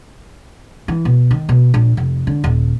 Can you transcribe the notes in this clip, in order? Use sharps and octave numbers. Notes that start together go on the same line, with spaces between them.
E3
B2
D#3
B2
A#1
F1
D3
D#1